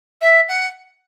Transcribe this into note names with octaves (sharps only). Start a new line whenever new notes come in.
E5
F#5